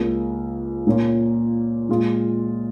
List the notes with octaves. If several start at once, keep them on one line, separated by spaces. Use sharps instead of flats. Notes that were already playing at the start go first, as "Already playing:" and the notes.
Already playing: C#2 C#3 A#3
A#2 A#3 C#4 F4
A#2 G#3 F4